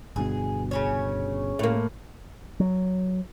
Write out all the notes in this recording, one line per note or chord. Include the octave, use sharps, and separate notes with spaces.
G1 G2 B2 G#4
C#3 C#4 C#5
A2 A#3
F#3